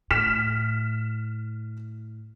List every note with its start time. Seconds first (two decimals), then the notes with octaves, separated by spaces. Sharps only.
0.11 A2 F6 B6 E7